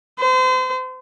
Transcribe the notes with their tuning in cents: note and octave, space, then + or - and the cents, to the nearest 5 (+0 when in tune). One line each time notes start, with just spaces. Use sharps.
C5 -35